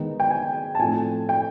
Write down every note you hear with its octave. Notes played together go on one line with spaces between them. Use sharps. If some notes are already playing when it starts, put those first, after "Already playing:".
Already playing: D#3 G#3 B3 D#4
G5
G#5
A5
A2 F3 A3 C4 G#5
G5